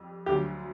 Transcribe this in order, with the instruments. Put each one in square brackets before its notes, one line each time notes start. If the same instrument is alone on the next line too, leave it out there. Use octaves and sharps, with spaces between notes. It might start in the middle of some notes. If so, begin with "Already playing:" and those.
Already playing: [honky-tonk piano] F2 G3
[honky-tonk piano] D2 D3 F#3 [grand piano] G4